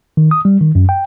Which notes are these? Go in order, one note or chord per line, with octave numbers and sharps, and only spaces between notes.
D#3
D#6
G3
D#3
F#2
G5